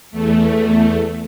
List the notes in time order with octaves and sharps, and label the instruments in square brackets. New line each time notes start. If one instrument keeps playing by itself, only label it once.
[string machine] E2 A3